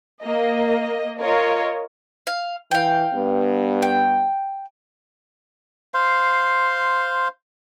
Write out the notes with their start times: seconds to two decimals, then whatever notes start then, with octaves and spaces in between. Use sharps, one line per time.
0.22 A#3 D#5
1.20 F4 A#4 C#5 D#5
2.27 F5
2.71 E3 F5 G5
3.13 G2 B3
3.82 G5
5.94 C5 F5 C6